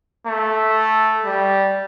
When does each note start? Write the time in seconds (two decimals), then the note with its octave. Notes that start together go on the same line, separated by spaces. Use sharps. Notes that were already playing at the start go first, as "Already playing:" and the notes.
0.27 A3
1.25 G3